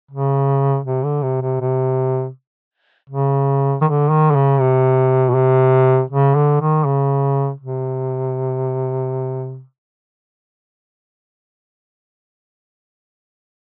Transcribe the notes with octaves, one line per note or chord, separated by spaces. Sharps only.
C#3
C3
D3
C3
C3
C3
C#3
D#3
D3
D#3
D3
C#3
C3
B2
C3
C#3
D3
D#3
C#3
C3